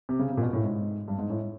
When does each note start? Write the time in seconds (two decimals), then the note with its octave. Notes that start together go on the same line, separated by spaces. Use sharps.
0.09 C3
0.19 C#3
0.30 C3
0.37 A#2
0.42 B2
0.53 A2
0.64 G#2
1.08 G2
1.18 G#2
1.30 A2